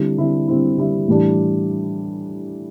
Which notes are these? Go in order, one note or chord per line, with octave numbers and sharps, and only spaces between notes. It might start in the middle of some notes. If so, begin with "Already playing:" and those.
Already playing: D3 G3 C4 E4
D3 G3 C4 E4
D3 G3 C4 E4
D3 G3 C4 E4
A2 E3 G3 D4